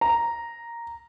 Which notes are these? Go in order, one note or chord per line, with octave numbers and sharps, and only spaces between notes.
A#5